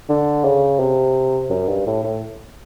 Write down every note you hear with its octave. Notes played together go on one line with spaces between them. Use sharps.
D3
C#3
C3
F#2
G2
A2
A2